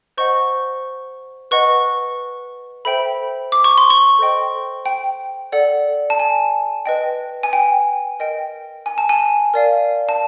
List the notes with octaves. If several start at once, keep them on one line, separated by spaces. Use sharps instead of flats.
C5 D#5 F#5 C#6
B4 D#5 F#5 C#6
A4 C5 E5 G5 B5
D6
C#6
C6
C#6
A4 C5 D#5 G5
G5
A4 D5 F#5
A5
G#5
B4 D#5 G5
G#5
G5
A#4 D#5 G5
G#5
A5
G#5
A#4 D5 F5
A5